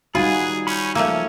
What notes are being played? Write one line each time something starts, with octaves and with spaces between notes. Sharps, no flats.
G3 D#4 F4 F#4 G#4 B4 G#5 B5
C#4 B5 G6
F3 A3 A#3 C#4 E6